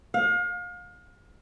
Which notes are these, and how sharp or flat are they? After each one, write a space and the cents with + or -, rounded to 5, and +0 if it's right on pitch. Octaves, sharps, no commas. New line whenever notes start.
F5 +35